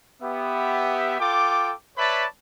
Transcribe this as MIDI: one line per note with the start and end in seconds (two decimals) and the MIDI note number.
0.23 1.19 59
0.23 1.19 67
0.23 1.19 76
1.20 1.73 65
1.20 1.73 69
1.20 1.73 79
1.20 1.73 86
1.98 2.26 71
1.98 2.26 73
1.98 2.26 74
1.98 2.26 76
1.98 2.26 81
1.98 2.26 83